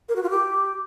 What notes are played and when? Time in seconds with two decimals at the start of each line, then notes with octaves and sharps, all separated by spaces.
0.09 A#4
0.16 F#4
0.23 F4
0.30 G4